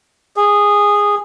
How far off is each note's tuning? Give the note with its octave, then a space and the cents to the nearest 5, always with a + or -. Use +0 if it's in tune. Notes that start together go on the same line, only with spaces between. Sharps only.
G#4 -15